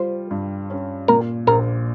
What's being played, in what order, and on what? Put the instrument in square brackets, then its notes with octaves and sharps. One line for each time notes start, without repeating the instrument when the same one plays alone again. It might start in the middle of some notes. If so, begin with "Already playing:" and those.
Already playing: [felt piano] G3 F4 [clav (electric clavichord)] C5
[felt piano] G2
C#4
[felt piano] A#2 [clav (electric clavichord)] A#4
[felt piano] A#1 [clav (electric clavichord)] A#4